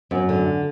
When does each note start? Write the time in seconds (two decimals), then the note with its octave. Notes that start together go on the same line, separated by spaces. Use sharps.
0.11 F#2
0.29 D3